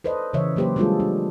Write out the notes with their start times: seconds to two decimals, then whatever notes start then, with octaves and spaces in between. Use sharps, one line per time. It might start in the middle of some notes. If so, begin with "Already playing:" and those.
0.04 A4 B4 C5 D5 D#5
0.33 C#3 E3 C#5 D#5 E5
0.56 F#3 A#3 G4 B4 C5
0.76 G3 G#3 D4 F4 G#4 A4
1.00 D4